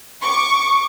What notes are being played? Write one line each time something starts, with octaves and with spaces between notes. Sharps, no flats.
C#6 D6